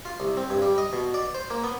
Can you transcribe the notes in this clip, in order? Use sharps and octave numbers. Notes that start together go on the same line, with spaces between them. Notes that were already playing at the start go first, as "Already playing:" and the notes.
F4
C2
C4
G2
G3
D#5
B2
D5
C5
A#3
B3